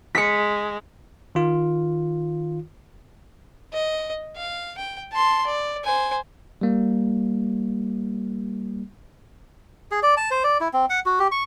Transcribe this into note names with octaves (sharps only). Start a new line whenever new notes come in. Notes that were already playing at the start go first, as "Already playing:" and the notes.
G#3 B6 C#7
D#3 F4
D#5
F5
G5
A5 C6
D5
C5 G#5
G3 A#3
G#4
D5
A5
C5
D5
E4
C4
F#5
F#4
G4
C#6